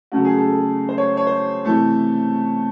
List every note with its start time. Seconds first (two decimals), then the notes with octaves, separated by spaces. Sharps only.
0.12 C#3 F#3 A3 F#4
0.25 G#4
0.38 A4
0.51 A4
0.89 C5
0.98 C#5
1.17 C#5
1.27 C5
1.65 C3 E3 A3 A4